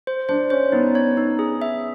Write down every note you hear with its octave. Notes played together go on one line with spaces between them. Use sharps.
C5
D4 C5
C#4 C5
B3 D#4
C#5
D#4
G#4
E5